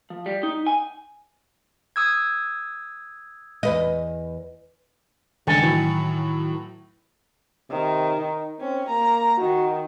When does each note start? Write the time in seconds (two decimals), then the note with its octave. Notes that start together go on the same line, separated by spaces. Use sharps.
0.10 F3
0.26 G3
0.43 D#4
0.67 G#5
1.96 D#6 E6 G#6
3.63 E2 B4 D#5
5.47 C#2 G2 D#3 G#3 A4 G#5
5.62 A2 E3 F#3
7.70 C3 D#3
8.18 D#4
8.60 C4 C#4
8.89 A#3 A#5
9.38 D#3 F#4